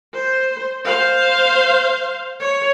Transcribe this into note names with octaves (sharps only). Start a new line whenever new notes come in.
C5
C5 F5
C#5